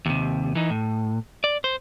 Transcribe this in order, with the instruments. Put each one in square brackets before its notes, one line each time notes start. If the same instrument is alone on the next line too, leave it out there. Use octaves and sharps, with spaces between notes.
[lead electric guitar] D#2 C3
E3 D#4
A2
D5
C5